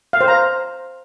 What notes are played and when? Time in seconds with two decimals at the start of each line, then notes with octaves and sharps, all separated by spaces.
0.13 F5
0.21 C5
0.28 A#5